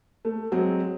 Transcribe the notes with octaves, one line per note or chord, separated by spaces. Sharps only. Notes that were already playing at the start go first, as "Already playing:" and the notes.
A3
F#3 G#3 C4